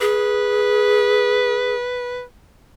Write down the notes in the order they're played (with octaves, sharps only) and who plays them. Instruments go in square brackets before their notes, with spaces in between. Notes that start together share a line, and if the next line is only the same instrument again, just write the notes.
[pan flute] G#4 [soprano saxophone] B4